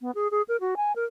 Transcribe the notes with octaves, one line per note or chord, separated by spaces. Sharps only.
B3
G#4
G#4
A#4
F#4
G#5
A#4